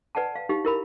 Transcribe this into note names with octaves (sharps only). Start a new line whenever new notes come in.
B4 D5 F#5 G#5 A5
F5
D#4 G4 F5
E4 A#4 B5